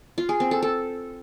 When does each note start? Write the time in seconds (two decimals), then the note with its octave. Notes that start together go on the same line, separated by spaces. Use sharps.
0.18 F4
0.29 G#4
0.40 C4
0.51 A4
0.63 A4